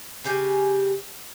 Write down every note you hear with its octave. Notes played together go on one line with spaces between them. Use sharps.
C#3 G4 G#5